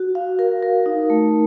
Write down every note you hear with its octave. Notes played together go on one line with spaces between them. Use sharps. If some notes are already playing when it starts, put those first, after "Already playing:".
Already playing: F#4
F5
A#4
A#4
D#4
A3